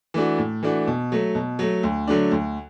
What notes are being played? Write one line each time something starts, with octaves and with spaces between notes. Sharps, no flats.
E3 A3 D4 F#4
A2
E3 A3 D4 F#4
B2
F#3 A3
B2
F#3 A3
D2
D3 F#3 A3 D4
D2